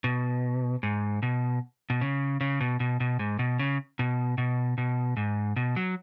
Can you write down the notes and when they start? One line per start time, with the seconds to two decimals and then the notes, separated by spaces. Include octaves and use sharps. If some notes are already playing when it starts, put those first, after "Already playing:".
0.04 B2
0.83 G#2
1.23 B2
1.90 B2
2.01 C#3
2.41 C#3
2.61 B2
2.80 B2
3.00 B2
3.19 G#2
3.39 B2
3.59 C#3
3.99 B2
4.38 B2
4.78 B2
5.17 G#2
5.56 B2
5.76 F#3